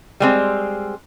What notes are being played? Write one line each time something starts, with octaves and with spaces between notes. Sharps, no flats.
G3 G#3 C4